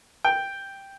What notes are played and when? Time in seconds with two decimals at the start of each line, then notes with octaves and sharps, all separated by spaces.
0.25 G5